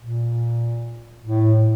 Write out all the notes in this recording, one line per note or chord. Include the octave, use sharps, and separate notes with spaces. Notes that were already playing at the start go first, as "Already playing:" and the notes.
A#2
A2